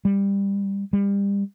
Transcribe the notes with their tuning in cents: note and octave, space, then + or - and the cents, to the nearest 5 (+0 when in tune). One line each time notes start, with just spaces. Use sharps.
G3 +15
G3 +30